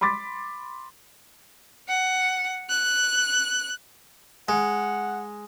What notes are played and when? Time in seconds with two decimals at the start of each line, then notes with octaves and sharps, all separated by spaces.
0.01 B5 C6 D6 A6 B6
1.90 F#5
2.70 F#6
4.49 G#3 F#5